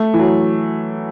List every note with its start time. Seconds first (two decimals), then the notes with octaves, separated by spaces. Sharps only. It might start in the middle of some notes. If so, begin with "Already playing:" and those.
Already playing: A3
0.14 E3
0.19 F#3